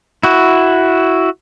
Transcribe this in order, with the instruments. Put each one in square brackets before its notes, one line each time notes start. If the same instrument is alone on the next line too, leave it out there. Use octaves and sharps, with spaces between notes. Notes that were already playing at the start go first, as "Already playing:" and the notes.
[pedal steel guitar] E4 F#4